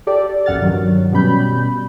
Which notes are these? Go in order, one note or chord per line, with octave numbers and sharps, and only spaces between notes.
G4 A4 D5
A#1 F#2 F#5 F6 A6
G2 D#3 F#3
B2 G3 C#4 B5 G6